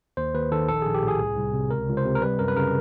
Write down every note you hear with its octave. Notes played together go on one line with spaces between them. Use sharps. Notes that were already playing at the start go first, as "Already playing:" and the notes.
D#2 C5
D#2 B4
D#3 A4
A#1 A4
A#1 G#4
G4
A2 G#4
C2
C2
C3
C#2 A#4
C#2
C5
C3
A#4
G3 B4
F#2 A#4
B4
C#3 A#4